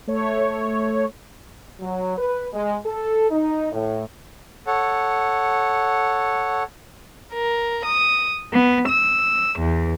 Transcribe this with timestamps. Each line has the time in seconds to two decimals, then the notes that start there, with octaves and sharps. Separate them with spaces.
0.07 A3 C#5
1.80 F#3
2.18 B4
2.53 G#3
2.86 A4
3.30 D#4
3.72 A2
4.67 A4 C#5 F#5
7.33 A#4
7.85 D#6
8.52 B3
8.88 E6
9.59 E2